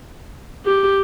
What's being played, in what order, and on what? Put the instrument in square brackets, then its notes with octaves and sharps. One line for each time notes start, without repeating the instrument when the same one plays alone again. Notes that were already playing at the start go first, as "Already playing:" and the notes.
[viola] G4